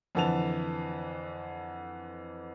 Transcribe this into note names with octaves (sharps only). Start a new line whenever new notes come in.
F2 D3 E3 A5 F7